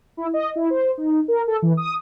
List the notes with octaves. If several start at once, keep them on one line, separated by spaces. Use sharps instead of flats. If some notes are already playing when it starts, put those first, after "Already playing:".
E4
D#5
E4
C5
D#4
A#4
A4
E3
D#6